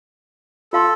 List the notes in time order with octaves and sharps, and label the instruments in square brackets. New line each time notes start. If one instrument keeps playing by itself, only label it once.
[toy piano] F4 F5 C6 [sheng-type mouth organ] A4